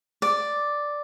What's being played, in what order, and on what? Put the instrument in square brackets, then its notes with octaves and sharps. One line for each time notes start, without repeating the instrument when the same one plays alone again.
[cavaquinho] D5